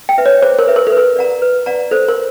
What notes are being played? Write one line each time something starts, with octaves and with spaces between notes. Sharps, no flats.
G5
B4 E5
C#5
G#4 C5
A#4
B4 E5
A#4
A4
A#4 B4
D5 F#5 A#5
B4
D5 F#5 A#5
A4 C5
A#4